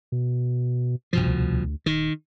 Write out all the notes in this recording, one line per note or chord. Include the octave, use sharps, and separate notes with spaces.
B2
C2 G2 B2 F3
D2
D#1 D#3